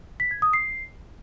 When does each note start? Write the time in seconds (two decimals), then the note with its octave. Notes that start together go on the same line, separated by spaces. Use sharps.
0.20 B6
0.31 G#6
0.42 D#6
0.53 C7